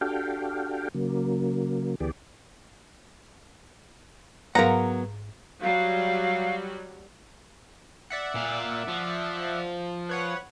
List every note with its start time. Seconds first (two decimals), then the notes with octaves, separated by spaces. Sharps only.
0.01 D4 F#4 G4 A4 F5 G5
0.94 C#3 F#3 A#3
2.00 D2 E3 B3 G4 G#4 D5
4.55 G#2 F#3 B3 A#4 F5 F#5 A#5 A#6
5.62 F#3 G3 F#4 F5
8.10 D5 E5 F#5
8.35 A#2 F5
8.88 F3
10.09 B4 C#5 F#5